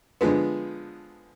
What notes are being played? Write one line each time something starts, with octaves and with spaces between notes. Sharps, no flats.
D3 F3 G#3 B3